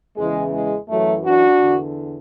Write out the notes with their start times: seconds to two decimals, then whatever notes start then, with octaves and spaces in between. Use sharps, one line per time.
0.17 E2 C#3 E3 G#3
0.53 G#3
0.89 F#2 E3 F#3 A3
1.25 D4 F#4
1.61 E2 D3